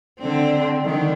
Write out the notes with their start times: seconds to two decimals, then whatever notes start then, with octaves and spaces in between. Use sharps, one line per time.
0.20 D3 C4
0.85 D3 D#3